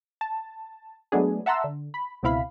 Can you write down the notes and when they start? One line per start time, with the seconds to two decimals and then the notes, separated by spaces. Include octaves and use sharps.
0.21 A5
1.12 F#3 G#3 A3 B3 D4 G#4
1.46 E5 F#5 A5 A#5 C6 E6
1.64 D3
1.94 B5
2.23 C#2 B2 C4 E4 F5 B5